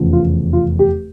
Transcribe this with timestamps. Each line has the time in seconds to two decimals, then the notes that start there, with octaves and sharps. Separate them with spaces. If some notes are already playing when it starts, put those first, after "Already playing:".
Already playing: F1 E2 C#3 F3
0.13 F4
0.53 F4
0.79 G4